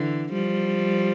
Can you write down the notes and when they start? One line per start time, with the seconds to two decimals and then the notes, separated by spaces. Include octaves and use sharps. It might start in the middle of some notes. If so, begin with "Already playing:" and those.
Already playing: D3 E3
0.32 F3 G3